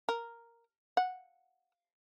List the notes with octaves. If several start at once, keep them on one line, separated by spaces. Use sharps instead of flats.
A#4
F#5